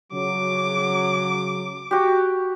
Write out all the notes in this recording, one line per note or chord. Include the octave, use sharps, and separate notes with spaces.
C#3 F#3 D6
F#4 G4